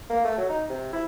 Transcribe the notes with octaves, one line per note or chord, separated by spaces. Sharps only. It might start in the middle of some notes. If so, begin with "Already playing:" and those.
A#3
A3
F#3
D#4
C3
E4